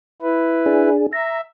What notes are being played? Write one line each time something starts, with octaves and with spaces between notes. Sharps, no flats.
E4 B4
D4 G#4
E5 A#5